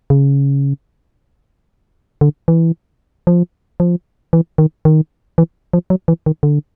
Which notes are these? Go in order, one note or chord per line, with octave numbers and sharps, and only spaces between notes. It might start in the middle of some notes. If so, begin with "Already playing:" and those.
C#3
D3
E3
F3
F3
E3
D#3
D#3
E3
F3
F#3
E3
D#3
D3